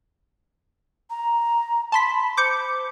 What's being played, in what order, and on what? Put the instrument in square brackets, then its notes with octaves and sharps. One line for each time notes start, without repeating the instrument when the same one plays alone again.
[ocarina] A#5
[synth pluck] A5 C6 B6 [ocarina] B5
[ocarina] C5 [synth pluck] D6 G6 C#7